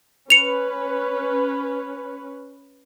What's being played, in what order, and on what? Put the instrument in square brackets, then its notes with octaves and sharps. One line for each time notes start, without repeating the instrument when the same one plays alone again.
[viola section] C#4 B4 [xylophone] C#7 F7